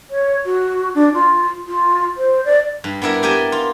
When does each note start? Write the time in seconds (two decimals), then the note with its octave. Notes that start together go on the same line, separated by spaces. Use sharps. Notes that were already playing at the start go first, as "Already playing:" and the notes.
0.10 C#5
0.45 F#4
0.95 D4
1.14 F4
1.67 F4
2.17 C5
2.45 D5
2.84 G2
3.02 B3 D4 E4 A#4
3.23 B3 G4 A#4 D5 G#5 A5
3.52 F4